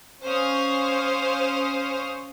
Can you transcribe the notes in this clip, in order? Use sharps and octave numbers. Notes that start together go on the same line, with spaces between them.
C#4 C5 F5 C#6 D#6